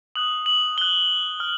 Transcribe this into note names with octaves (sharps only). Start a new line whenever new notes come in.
D#6 F#6 F#7
F#7
D#6 F#6 G7
F6